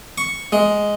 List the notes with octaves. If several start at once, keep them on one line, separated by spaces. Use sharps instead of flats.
C#6
G#3